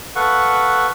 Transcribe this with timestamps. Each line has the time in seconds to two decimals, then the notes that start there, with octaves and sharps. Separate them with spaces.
0.16 A4 B4 F5 F#5 C#6